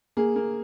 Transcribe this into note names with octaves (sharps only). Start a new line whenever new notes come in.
A#3 G#4
A#3